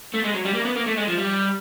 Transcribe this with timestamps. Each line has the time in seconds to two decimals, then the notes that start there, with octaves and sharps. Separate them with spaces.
0.14 A3
0.24 G#3
0.34 F#3
0.45 G3
0.55 A#3
0.65 B3
0.76 A#3
0.86 A3
0.97 G#3
1.07 F3
1.18 G3